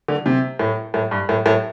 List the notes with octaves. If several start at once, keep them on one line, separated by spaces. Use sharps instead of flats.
D3
C3
A2
A2
G2
A2
A2